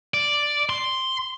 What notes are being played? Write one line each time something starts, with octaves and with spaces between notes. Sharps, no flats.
D5
C6